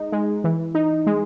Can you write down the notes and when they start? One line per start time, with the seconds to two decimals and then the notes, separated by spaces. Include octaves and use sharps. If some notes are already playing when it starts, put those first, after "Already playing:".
Already playing: G#3 D#4
0.12 G#3
0.44 E3
0.75 D#4
1.07 G#3